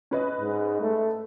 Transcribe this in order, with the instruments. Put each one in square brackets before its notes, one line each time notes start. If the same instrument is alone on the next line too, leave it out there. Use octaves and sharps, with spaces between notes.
[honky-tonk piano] C#4 B4 D#5
[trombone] G#2
A3